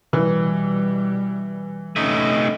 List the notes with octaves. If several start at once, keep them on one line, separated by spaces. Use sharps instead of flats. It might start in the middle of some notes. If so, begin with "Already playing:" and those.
B2 E3 G3
A3 C#4 D#4